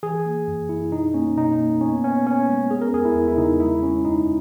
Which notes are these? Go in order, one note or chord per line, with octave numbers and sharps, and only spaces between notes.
E3 G#4
A#3
F#2
F#2 E4
B2 D#4
A#3 C#4
B2 D#4
A#3
B3 C#4
B3 C#4
B3 C#4
G#3
B3 G#4
A#4
E2 G#4
E4
E2
E4
C#3 D#4
G#3 E4
G#3 C#4
F#2 D#4